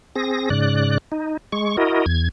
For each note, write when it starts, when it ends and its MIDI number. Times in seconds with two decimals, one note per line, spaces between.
0.16 0.49 60
0.16 0.49 68
0.16 0.49 94
0.50 0.98 44
0.50 0.98 49
0.50 0.98 74
0.50 0.98 90
1.12 1.37 63
1.52 1.77 56
1.52 1.77 85
1.77 2.06 64
1.77 2.06 66
1.77 2.06 70
1.77 2.06 75
2.06 2.29 40
2.06 2.29 92